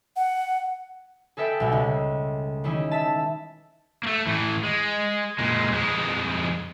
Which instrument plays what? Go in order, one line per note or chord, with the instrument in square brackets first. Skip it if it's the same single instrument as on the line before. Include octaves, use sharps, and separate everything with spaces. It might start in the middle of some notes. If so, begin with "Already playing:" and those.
[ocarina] F#5
[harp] G#4 A4 B4 E5 G5
C2 B2
C#2
D#3 E3 C#4 E4 G4 G#4
E5 A5
[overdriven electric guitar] A3 A#3
A2 E3
G#3
A#2 G#3
F2 G#3